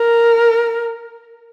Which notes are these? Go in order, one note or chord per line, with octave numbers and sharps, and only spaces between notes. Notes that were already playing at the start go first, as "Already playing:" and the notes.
Already playing: A#4